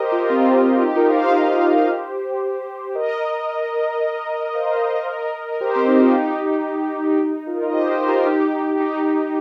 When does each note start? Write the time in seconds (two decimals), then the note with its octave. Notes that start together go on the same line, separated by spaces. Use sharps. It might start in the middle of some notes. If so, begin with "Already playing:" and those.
Already playing: G4 A#4 C5 D#5
0.12 F4 A#4
0.29 C4 F4
0.82 D#4 G4
0.95 F4 A#4
1.09 C5 F5
1.22 A#4 D#5
1.35 G4 C5
2.95 A#4 D#5
4.55 C5 F5
5.07 A#4 D#5
5.52 A#4
5.61 G4 C5
5.75 C4
5.88 D#4
6.01 F4
6.14 D#4 G4
7.20 D#4
7.47 F4 A#4
7.62 D#5
7.73 G4 C5
7.91 G4 C5
8.02 C5
8.08 F4 A#4
8.26 D#4 G4
8.80 D#4 G4